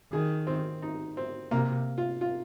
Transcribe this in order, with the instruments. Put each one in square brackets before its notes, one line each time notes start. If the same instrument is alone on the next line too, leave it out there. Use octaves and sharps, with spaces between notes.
[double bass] D#3 [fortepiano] G#4
[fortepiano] C4
D#4
C4
[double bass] C3 [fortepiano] A#3
[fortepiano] F4
F4